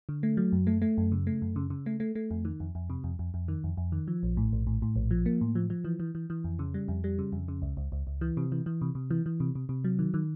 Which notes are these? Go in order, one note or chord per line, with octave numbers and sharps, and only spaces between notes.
D3
A3
F#3
F#2
A3
A3
F#2
C#3
A3
F#2
C#3
C#3
A3
A3
A3
F2
D#3
F2
F2
C3
F2
F2
F2
D#3
F2
F2
D#3
F3
A#1
A2
A#1
A2
A2
A#1
F3
A#3
A2
F3
F3
E3
E3
E3
E3
F2
C#3
G3
F2
G3
C#3
F2
C#3
C#2
C#2
C#2
C#2
E3
C3
E3
E3
C3
C3
E3
E3
C3
C3
C3
F#3
D#3
D#3